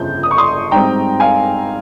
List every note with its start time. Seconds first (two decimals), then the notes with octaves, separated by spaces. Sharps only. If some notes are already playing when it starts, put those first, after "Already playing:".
Already playing: G1 F2 C#3 G6
0.23 D#6
0.31 C#6
0.38 C6 D#6
0.71 G#2 G3 C4 G5 A#5
1.20 F5 G#5